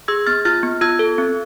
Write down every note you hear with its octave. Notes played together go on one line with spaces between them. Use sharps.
G#4 E6 G#6
B3 F6 A6
F4 F6 A6
B3
F4 E6 G#6
A4
C4